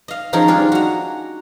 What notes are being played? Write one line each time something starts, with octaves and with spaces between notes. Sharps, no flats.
D#5 F5
D#3 F3 C#4 D#4 G#4 A#4
G3 D4 F4 G#4
F#4 A#5